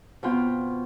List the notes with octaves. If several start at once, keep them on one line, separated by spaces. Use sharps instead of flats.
B2 C4 F4